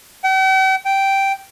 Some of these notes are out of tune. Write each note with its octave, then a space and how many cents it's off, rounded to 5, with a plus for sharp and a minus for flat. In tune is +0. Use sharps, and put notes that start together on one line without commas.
G5 -45
G5 -5